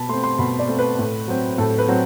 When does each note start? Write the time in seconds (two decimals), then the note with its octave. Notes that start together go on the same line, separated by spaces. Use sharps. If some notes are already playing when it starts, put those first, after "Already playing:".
Already playing: B2 A5 B5
0.09 A3 C4 C6
0.24 C6
0.39 B2 B5
0.59 D5
0.68 A3 C4
0.79 B4
0.99 A2
1.28 F#3 C4
1.58 A2 A4
1.78 B4
1.88 F#3 C4